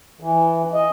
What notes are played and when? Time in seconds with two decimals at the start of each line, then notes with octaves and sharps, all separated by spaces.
0.20 E3
0.74 D#5